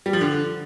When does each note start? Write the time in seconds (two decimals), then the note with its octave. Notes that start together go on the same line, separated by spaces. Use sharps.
0.06 G3
0.13 F3
0.21 D3